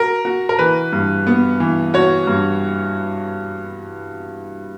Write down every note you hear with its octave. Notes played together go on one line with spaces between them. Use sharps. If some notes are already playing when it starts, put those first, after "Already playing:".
Already playing: F#4 A#4
F#4
A#4
E3 B4
G2
B3
E3
F#4 C#5
G2